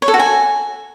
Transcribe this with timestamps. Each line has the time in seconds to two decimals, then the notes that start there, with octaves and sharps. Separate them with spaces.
0.02 C#5
0.08 A4
0.14 F#4
0.20 G#5